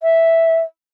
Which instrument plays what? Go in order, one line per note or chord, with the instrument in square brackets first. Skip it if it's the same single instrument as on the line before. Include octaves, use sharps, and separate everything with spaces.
[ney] E5